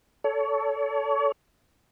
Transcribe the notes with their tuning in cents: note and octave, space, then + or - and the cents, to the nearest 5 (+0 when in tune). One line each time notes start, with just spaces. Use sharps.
A4 +0 C#5 +35